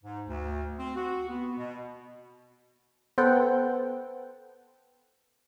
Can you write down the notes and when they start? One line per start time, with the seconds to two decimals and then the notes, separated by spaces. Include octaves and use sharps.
0.04 G#2
0.27 D2
0.79 C4
0.96 F#4
1.29 B3
1.58 B2
3.18 B3 A4 C5 F#5 G5